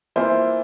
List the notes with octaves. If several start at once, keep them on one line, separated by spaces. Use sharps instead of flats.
E3 A#3 F4 C5 E5